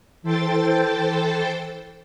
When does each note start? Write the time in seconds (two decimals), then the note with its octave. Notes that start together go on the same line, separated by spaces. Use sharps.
0.23 E3 A4 C5 G5 A6